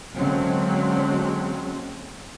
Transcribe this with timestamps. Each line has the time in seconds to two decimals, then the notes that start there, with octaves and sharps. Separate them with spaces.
0.16 D3 F#3 G#3 A#3 C4 C#4